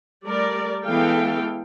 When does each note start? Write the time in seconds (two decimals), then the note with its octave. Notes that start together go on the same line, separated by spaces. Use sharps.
0.24 G3 A3 A#4 D5
0.86 E3 G#3 B3 A4 F5 G5